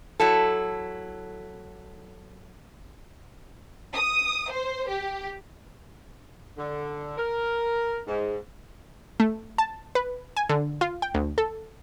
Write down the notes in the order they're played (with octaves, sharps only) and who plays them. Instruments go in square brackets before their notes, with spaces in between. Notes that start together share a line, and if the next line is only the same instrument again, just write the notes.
[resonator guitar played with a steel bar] F#3 E4 A4
[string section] D#6
C5
G4
[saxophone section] D3
A#4
G#2
[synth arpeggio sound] A3
A5
B4
G#5
D3
F4
G5
D2
A4